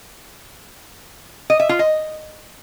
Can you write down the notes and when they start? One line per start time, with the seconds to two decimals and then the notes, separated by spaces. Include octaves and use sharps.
1.50 D#5
1.60 E5
1.69 F4
1.79 D#5